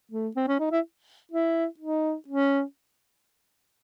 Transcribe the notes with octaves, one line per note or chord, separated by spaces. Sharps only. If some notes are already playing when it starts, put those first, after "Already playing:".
A3
C4
C#4
D#4
E4
E4
D#4
C#4